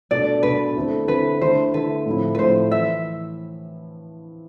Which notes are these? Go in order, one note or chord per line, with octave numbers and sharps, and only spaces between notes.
B2 A3 D4 D5
B2 A3 D4 B4
D3 A3 C4 E4
D3 A3 C4 E4 B4
D3 A3 E4 C5
D3 A3 E4 B4
A2 F3 A3 C4 E4
B4
A2 F3 A3 C4 E4 C5
E3 E5